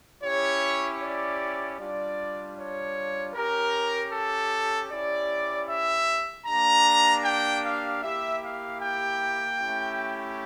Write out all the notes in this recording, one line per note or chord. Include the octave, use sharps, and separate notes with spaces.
C#4 E4 G4 C#5
D5
G3 D4 F4 D5
C#5
C#4 G4 A#4
A4
C#4 E4 G4 D5
E5
A#3 D4 G4 A#5
G5
F5
A#3 E4 G4 E5
F5
G5
A3 C#4 E4 G4